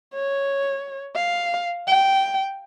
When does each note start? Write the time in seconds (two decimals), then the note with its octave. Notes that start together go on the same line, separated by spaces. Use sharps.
0.14 C#5
1.16 F5
1.87 G5